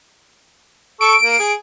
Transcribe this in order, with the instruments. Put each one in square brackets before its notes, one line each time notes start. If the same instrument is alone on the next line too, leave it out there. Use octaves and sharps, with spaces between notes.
[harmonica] A4 C#6 [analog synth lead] D7
[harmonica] A#3
G#4